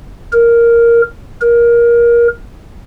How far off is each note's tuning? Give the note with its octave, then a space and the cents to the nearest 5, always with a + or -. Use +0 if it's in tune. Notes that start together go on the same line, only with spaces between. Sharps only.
A#4 +0
A#4 +20